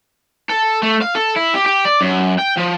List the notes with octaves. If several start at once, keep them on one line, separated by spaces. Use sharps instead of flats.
A4
A3
F5
A4
E4
G4
G4
D5
F#2
G5
F3